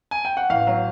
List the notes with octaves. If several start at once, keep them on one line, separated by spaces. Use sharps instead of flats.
G#5
G5
F#5
A1 F5
F#3